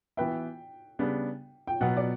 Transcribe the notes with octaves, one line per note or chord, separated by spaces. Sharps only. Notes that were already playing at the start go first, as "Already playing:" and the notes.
E3 B3 F#4 B4 E5 G5
C#3 G3 B3 D4
G5
B2 F#3 B3 F#5
D5